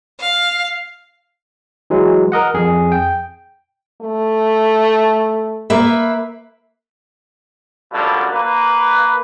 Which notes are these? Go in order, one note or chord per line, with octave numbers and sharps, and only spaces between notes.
F5
E3 F#3 G#3
A#4 D#5 F#5
F2 G#4
G5
A3
A#3 B4 E5
F#2 B2 D3 G3 A3 F4
A#3 B4